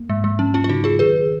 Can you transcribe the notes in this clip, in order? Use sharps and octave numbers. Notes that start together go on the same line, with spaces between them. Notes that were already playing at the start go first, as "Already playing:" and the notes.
Already playing: A#3
G#2 G#3
G#3
F#3 C#4
C#4 F4
F4
C#3 D#4 F#4
F4 G#4
D#3 G#4 B4